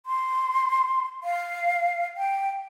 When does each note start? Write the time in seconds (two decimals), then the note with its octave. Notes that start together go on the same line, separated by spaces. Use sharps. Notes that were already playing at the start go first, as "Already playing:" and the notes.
0.06 C6
1.24 F5
2.17 G5